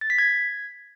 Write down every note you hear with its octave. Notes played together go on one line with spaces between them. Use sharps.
A6
B6
G#6